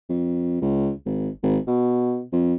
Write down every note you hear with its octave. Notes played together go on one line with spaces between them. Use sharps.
F2
C#2
G#1
G#1
B2
F2